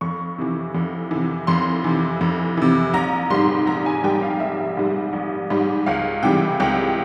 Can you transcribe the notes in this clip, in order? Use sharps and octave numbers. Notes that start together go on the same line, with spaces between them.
F2 C#6
C3 E3
F2
C3 E3
F2 C6
C3 E3
F2
C3 E3
A#1 A#5
G#2 G3 C6
A#1 A#5
G#5
G#2 G3 G5
F5
A#1 E5
G#2 G3
A#1
G#2 G3
C#2 F5
C3 E3 G3 G5
C#2 G5